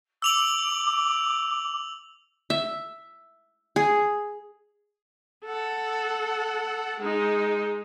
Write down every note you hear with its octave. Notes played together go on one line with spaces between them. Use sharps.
D6 E6 F7 F#7
E5
G#4
A4 F#5
G#3 D#4